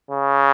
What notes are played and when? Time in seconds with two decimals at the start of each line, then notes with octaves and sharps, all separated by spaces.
0.11 C#3